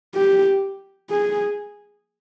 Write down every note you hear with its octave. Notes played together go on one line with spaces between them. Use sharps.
G4
G#4